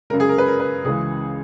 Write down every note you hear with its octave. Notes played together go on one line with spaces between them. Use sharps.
F#2 C#3 G#3 A#4
G#4
A#4
B4
A#4
B4
C#2 C#3 E3 G#3 G#4